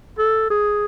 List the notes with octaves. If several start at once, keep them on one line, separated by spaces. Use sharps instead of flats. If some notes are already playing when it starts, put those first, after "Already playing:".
A4
G#4